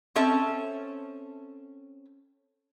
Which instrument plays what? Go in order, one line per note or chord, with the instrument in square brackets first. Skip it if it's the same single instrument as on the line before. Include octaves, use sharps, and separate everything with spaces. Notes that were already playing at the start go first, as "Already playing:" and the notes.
[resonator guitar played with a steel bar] C4 C#4 A4 E5 A5